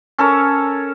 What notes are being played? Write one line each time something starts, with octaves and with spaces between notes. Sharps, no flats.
C#4 A4 A#4 C#5